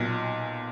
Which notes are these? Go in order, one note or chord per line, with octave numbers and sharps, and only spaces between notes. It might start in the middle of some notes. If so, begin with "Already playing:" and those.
Already playing: B1 A#2